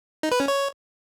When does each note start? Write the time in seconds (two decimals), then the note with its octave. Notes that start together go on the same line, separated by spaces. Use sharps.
0.23 D#4
0.32 B4
0.40 C#4
0.48 C#5